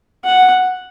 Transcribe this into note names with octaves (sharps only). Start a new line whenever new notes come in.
F#5